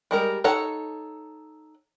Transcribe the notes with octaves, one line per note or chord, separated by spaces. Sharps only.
G3 G#3 A#4
D#4 A4 C#5 F#5